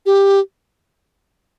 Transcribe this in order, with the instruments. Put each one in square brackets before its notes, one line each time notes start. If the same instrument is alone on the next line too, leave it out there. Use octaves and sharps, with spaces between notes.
[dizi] G4